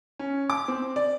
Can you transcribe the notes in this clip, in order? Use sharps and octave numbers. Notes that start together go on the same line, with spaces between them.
C#4
D6
C4
D5